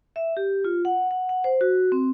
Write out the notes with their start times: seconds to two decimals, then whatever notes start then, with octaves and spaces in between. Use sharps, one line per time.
0.16 E5
0.37 G4
0.65 F4
0.85 F#5
1.11 F#5
1.29 F#5
1.44 C5
1.61 F#4
1.92 C4